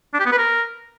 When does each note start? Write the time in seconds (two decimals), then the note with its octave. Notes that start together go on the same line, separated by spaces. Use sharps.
0.14 D4
0.20 G4
0.26 B3
0.32 B4
0.38 A#4